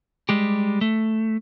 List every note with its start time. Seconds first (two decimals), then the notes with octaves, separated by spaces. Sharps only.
0.29 G3 G#3 G4
0.81 A3